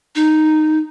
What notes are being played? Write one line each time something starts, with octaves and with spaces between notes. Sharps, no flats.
D#4